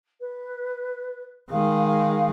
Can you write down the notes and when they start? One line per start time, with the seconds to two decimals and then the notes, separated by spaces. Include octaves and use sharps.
0.20 B4
1.51 D#3 G#3 F5
1.85 F5